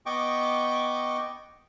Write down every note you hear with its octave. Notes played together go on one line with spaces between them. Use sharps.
B3 D#5 G5 C#6 D6